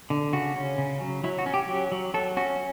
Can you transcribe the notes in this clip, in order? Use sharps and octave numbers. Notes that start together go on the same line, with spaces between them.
D3
C#3 F#4
C#4
C#3
F#3
F#3 E4
F#4
C#4
G4
F#3 G4
F#3
F#3 A4
C#4 F#4